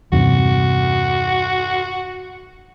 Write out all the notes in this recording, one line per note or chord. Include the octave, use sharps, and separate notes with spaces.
E2 G2 C3 F#4